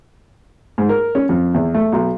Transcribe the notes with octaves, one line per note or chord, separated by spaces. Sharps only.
G#2
A#4
C#4
F2
E2
A3
B1